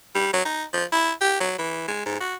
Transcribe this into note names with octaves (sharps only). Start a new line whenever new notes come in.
G3
F#3
D#4
F3
E4
G4
F#3
E3
G#3
G#2
F#4